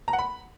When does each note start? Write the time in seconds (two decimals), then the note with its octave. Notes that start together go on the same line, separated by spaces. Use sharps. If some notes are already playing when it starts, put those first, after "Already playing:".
0.08 A#5
0.13 F#5
0.19 B5